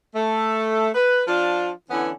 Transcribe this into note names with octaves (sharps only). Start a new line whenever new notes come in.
A3
B4
F3 D4 F4
D3 E3 B3 C#4 E4